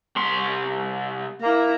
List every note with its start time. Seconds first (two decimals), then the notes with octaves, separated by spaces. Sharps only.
0.16 C2 C6
1.42 A#3 E4 A#5